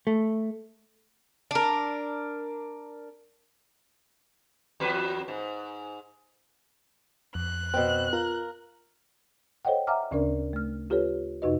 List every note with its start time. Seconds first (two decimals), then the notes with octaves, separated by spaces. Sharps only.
0.07 A3
1.51 D4 A#4
4.80 E2 F#3 B4
5.28 G#2
7.35 F2 F#6
7.74 B2 C4
8.13 F4 A#4
9.65 A4 C5 C#5 D#5 F#5 G5
9.87 E5 F#5 G#5 A#5 D6 F6
10.11 D2 C#3 C#4 D4 A#4 D5
10.53 A3 F6
10.90 F4 G4 A4 B4 C#5
11.42 F2 C3 D#4 F#4 B4 D#5